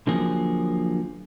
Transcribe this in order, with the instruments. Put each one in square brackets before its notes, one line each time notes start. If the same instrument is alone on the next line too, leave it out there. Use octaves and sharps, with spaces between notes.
[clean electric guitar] D3 F3 F#3 A#3 G#4